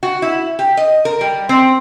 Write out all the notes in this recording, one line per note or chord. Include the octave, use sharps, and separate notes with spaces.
F#4
E4
G4
D#5
A#4
G3
C4